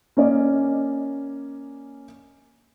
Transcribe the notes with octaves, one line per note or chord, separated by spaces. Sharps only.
A#3 C#4 D5 D#5